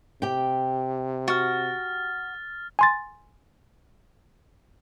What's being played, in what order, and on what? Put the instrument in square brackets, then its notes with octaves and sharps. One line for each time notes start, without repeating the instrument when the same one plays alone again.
[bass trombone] C3 [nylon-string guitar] G4 G5
[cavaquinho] F#4 [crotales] F6 A6
[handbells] G#5 C6 A6